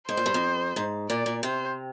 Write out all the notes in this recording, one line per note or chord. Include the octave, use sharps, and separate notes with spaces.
G#2 C5
A#2
G2
F2
G#2
A#2 D5
A#2
C3 C5